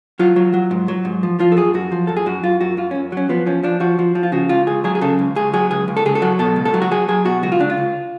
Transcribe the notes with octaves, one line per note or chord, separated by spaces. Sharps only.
F#3 F4
F#3
F#3
G#2
F#3
G#2
F3
F3 F4
A4
F#2 G#4
F#2 F#4
F3
F#2 A4
G#4
F#2 F#4
F#2 F4
F#2 F#4
F#2 F4
F#2 C#4
F#3 C#4
F3 B3
F3 C#4
F3 D4
F3 F#4
F3
F3
F4
C#3 F#4
C#2 F4
C#2 G#4
F#3 G#4
G#4
C#3 A4
C#2
C#2 G#4
F#3 G#4
C#2 G#4
C#2
A4
C#2 G#4
A4
F#3
B2 A4
C#2
A4
F#3
F#4
F#3 G#4
F#3 G#4
B2 F#4
C#2 F#4
F4
C#2 D4
F4
C#2